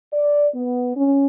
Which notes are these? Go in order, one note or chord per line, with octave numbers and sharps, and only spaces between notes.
D5
B3
C#4